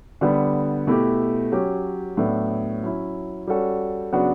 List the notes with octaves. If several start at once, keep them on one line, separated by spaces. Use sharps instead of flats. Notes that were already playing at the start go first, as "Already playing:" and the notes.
D3 G3 B3
B2 A3 E4 G4
F#3 C#4 G4
A2 F#3 B3 D4 A4
F#3 C#4 E4
G3 C#4 F#4 A4
C#3 F#3 B3 D4 F#4